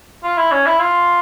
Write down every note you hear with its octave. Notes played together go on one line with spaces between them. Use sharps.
F4
E4
C#4
E4
F4